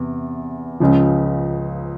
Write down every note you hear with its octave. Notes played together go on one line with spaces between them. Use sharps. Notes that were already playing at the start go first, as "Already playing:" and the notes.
Already playing: E2 C3
C#2 C#3 F3